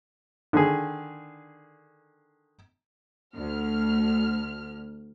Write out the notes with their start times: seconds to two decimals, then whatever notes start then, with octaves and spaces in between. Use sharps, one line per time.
0.53 D3 D#3 G#4
3.34 D2 F6